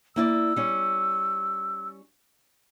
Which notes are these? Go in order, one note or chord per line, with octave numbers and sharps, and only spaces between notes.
A#3 E4 D5 E6
G3 C#4